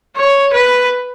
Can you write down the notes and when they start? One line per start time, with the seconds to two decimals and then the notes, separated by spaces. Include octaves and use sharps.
0.17 C#5
0.54 B4